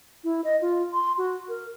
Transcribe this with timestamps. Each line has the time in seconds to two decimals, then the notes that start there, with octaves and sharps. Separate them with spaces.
0.24 E4
0.44 D#5
0.61 F4
0.93 C6
1.18 F#4
1.49 A#4